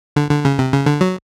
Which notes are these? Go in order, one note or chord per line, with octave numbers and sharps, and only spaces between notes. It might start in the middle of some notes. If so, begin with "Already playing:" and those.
D3
D3
C#3
C3
C#3
D3
F#3